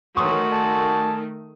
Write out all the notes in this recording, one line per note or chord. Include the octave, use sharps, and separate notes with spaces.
D#3 E3 F#3 A3 F#4 C6 C#6 D#6
D5 G#5 A5